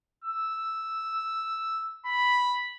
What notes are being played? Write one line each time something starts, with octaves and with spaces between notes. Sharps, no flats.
E6
B5